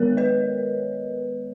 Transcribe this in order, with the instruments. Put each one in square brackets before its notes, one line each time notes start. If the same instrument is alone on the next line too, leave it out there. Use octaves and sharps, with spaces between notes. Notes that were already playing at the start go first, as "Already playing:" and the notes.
Already playing: [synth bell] D#3 G#3 B3 A#4 C#5
B4 D#5